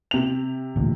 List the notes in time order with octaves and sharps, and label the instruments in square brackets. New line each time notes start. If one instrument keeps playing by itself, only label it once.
[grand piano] C3 F7
[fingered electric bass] A1 D2 A#2